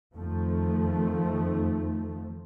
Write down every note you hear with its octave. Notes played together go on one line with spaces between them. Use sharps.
F2 D#3 F3 A3